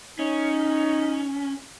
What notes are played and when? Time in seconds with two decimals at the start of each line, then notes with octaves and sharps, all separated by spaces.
0.19 C#4 D#4